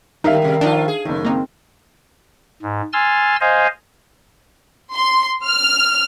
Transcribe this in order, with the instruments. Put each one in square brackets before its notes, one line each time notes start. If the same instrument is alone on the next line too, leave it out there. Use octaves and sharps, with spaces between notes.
[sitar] G#2 G3 [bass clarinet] D#3 [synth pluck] D#4 [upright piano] A#4 E5 F5
[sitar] C3 G3
[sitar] A2 F3 F4 [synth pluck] D4 D#4
[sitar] G#4
[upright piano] F#1 D#3 [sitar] A2
[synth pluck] A#3 D#4 [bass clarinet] C4
[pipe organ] G#2
G#5 C6 E6 F6 A6
C5 D#5 F5 G#5
[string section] C6
F6